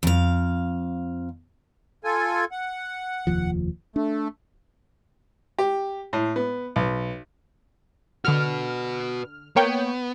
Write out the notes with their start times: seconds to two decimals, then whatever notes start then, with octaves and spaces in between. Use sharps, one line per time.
0.03 F2 F5
2.04 F4 A4 G#5
2.51 F#5
3.27 F1 D#2 F3
3.96 A3 D4
5.59 G4
6.13 A2
6.36 B3
6.76 B1
8.25 D3 F#4 B4 F6
9.56 A#3 B3 C#5 G5